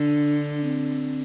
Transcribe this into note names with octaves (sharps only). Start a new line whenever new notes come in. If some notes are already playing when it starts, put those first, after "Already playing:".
Already playing: D3 D4
C4